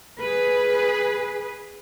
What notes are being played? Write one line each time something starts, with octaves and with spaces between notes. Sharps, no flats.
G#4 B4